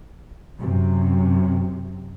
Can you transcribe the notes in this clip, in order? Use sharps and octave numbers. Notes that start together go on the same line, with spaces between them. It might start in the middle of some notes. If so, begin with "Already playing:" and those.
F#2 C3